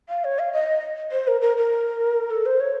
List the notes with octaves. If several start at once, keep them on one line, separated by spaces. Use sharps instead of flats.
F5
C#5
F5
D#5
C5
A#4
A#4
A#4
A4
C5
C#5